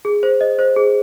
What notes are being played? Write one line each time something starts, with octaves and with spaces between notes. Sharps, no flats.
G#4
C5
D#5
C5
G#4